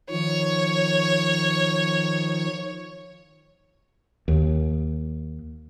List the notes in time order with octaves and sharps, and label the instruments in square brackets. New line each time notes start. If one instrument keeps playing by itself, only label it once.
[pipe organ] D#3 F3 [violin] C#5
[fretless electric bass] D#2